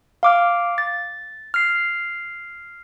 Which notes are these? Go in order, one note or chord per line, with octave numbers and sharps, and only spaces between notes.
F5 D6 F6
A6
F6 C7